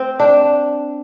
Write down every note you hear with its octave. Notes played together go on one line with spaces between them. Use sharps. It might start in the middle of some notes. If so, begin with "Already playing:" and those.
Already playing: C4
D4